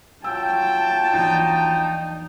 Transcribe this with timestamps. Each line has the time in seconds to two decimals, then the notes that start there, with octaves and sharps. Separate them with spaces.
0.24 F#3 F4 G5 A5 E6
1.13 A#1 E2 E3 D#4